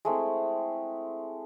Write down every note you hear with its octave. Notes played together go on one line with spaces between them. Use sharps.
G#3 A3 C4 E4